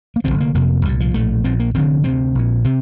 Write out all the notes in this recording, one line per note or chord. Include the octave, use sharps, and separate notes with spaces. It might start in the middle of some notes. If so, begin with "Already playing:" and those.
A#3
D#2 D3 C4
F1
A#3
F1 F2 C3 A#3
C2 A#2 G3
F3
A#1 A2 A3
A#1 A#2 C4
A#3
F1 F2 D3 C4
D2 C3 C4
A#1 A#2
C3 C4